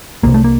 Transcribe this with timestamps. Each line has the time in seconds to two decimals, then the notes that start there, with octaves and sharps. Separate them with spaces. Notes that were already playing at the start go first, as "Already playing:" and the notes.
0.23 C2 C3 A#3
0.34 A3
0.44 A#3